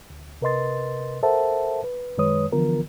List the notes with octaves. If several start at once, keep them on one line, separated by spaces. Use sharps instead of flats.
D2
C3 A#4 B4 D#5 C6 A6
A4 A#4 C5 E5 F#5 A5
B4
F#2 D#3 G#3 B4 C#5 D#6
D3 E3 F3 B3 F4 A#4